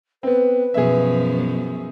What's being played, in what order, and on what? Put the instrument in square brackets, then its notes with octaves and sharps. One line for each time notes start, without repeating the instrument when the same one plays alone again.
[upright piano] B3 C4 [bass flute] B4
[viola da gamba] F#2 B2 F3 [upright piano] G#4 E5